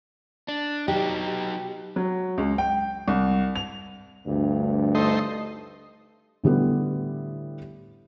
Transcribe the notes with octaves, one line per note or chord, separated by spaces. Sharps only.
D4
F#3 D#4 G4
F#3
C#2
G5
C2
F7
D2 G2
A3 D#4 C5
A2 D3 G3 B3